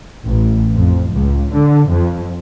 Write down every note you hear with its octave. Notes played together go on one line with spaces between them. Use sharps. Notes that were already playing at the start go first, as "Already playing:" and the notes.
A1
F2
C#2
D3
F2